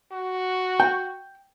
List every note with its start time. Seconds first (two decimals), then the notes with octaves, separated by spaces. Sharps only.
0.13 F#4
0.80 G5